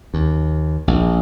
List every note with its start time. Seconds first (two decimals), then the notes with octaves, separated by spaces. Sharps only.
0.14 D#2
0.88 A#1